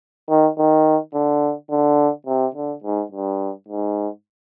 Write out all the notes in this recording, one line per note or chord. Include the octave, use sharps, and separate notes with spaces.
D#3
D#3
D3
D3
C3
D3
G#2
G2
G#2